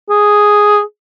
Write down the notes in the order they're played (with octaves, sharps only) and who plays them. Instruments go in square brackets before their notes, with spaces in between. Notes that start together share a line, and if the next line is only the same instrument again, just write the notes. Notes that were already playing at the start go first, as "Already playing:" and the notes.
[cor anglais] G#4